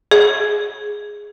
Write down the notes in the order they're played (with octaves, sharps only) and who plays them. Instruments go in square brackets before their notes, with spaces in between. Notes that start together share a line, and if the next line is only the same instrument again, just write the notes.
[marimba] G#4